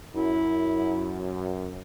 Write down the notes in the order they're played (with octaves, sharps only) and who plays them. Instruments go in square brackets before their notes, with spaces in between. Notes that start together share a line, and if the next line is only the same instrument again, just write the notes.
[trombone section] F#2 [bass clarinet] E4